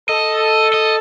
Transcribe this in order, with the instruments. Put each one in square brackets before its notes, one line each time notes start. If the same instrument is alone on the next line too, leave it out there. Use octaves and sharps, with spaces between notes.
[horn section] A4 [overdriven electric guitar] D#5
[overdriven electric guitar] D#5